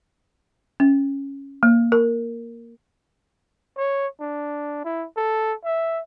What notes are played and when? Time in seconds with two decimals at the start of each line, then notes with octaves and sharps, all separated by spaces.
0.80 C#4
1.63 A#3
1.92 A#4
3.77 C#5
4.21 D4
4.85 E4
5.17 A4
5.65 E5